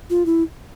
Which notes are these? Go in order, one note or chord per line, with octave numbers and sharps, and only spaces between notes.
F4
E4